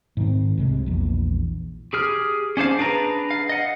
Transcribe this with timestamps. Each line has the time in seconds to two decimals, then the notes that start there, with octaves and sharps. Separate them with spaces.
0.17 G#2 D#3 C4
0.58 C2 C3 G#3
0.86 A#1 E2
1.93 G4 G#4 F6
2.57 C#4 D4 C5 F5
2.79 D4 G#4 B4 A#5
3.31 F5
3.49 D#5 F#5